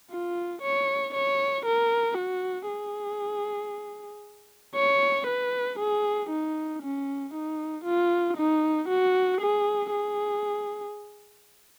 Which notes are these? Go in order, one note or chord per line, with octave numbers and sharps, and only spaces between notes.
F4
C#5
C#5
A#4
F#4
G#4
C#5
B4
G#4
D#4
C#4
D#4
F4
D#4
F#4
G#4
G#4